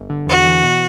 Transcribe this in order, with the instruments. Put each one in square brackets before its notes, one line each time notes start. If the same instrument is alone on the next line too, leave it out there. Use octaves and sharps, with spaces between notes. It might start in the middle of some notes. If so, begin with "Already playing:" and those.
Already playing: [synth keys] G1
D3
[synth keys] E2 [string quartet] F#4
[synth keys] E3
B2